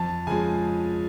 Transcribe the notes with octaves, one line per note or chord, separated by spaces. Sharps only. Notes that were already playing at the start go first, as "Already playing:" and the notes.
Already playing: F2 A5
C#3 F3 G#3 G#5